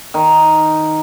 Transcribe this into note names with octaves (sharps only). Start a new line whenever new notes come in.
D#3